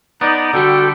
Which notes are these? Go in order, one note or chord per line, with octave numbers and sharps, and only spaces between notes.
B3 D#4 D5
D3 G3 F#4 A4 G5